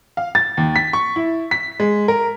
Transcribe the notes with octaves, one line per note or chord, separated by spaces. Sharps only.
F5
A6
D#2
B6
C#6
E4
B6
G#3
A#4